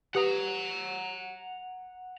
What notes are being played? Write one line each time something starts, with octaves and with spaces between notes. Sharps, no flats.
G4 B4 F#5 A#5 D#6